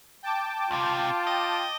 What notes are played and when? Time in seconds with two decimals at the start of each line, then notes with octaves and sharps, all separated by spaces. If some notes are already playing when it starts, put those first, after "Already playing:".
0.23 G5 A5 D6
0.71 C#2 C3 F4
1.27 D#5